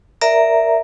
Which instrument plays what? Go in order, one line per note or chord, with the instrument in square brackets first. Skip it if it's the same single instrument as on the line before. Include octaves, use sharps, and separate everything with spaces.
[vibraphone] A#4 D5 E5 A#5